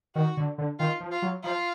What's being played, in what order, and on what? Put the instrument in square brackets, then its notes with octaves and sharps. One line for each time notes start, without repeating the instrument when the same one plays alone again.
[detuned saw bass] D#3 [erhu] F#4
[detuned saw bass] D3
D3
[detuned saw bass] D#3 [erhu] F4
[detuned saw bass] F3
[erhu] F4
[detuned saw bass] F#3
[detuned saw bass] F3 [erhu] F4